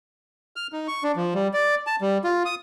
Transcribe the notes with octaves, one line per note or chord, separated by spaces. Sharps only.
F6
D#4
C#6
D4
F3
G3
D5
A5
G3
F4
D#6